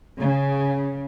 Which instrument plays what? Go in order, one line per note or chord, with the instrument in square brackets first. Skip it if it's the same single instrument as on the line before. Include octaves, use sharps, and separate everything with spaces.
[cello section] C#3